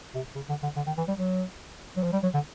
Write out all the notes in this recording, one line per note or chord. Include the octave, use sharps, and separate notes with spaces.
C3
C#3
D3
D3
D3
D#3
E3
G3
F#3
F#3
F3
G3
F#3
D3